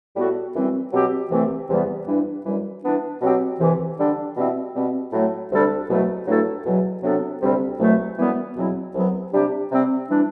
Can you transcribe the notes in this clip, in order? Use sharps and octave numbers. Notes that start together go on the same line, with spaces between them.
A2 G3 B3 F#4 A4
F#2 E3 G3 C4
B2 F#3 C4 G4
C2 C3 E3 A3 C4
E2 C3 E3 G3 B3
G2 E3 G3 D4
F#2 E3 G3
E3 B3 D4
B2 F#3 C4 G4
C2 C3 E3
D3 G3 D4 A4
B2 G3 C4 E4
B2 G3 C4
A2 F#3 A3
D2 C3 G3 D4 A4
C2 B2 F#3 A3
G2 F#3 A3 E4 A4
E2 B2 F#3
C3 F#3 B3 D4 A4
D2 C3 G3 C4
C2 B2 F#3 A3
F#2 E3 G3 B3
E2 B2 F#3 C4 E4
C2 C3 F#3 B3
C3 G3 D4 G4
C3 G3 C4
E3 G3 D4